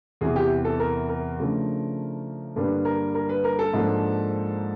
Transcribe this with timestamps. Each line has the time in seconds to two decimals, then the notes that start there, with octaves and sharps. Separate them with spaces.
0.21 E2 C3 E3 G#4
0.36 G4
0.65 A4
0.80 A#4
1.09 A#4
1.39 C#3 F3 A3 D4
2.56 G2 D3 G3 A#3 D4 B4
2.85 A#4
3.15 A#4
3.29 B4
3.44 A#4
3.59 A4
3.73 G#2 F3 A#3 D4